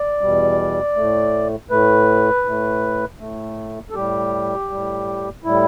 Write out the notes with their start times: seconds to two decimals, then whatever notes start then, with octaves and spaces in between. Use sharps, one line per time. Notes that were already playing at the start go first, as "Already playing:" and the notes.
Already playing: D5
0.21 E2 B2 G3
0.96 A2 A3
1.70 A2 A3 B4
2.45 A2 A3
3.20 A2 A3
3.90 A4
3.95 A2 G3 G4
4.70 A2 G3
5.44 A2 G3 E4